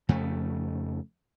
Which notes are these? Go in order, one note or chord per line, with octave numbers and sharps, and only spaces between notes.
F2 C#3 A3